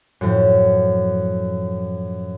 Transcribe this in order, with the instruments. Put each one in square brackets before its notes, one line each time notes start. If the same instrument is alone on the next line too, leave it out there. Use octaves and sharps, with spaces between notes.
[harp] F#2 A2 F3